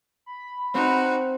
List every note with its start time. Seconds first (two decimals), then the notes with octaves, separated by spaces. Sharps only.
0.26 B5
0.74 C4 D#4 F#4